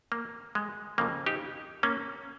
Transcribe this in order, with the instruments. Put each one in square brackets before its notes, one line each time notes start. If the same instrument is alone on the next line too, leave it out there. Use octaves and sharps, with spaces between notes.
[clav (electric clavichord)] A#3
G#3
F2 C#3 F3 A#3
D#4 G4
A#3 C#4